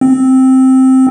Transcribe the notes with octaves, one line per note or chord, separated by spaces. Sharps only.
C4